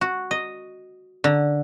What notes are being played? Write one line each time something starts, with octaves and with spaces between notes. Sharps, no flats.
F#4
D#5
D3